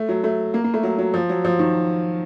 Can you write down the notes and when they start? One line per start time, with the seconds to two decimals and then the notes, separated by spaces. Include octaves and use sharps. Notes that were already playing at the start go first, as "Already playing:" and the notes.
Already playing: A3
0.09 F#3
0.24 A3
0.54 A#3
0.64 A#3
0.74 A3
0.83 F#3
0.98 F#3
1.14 F3
1.29 F#3
1.45 F3
1.59 D#3